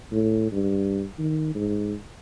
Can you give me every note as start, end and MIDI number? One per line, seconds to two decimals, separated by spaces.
0.12 0.51 45
0.52 1.04 43
1.19 1.51 51
1.55 1.94 44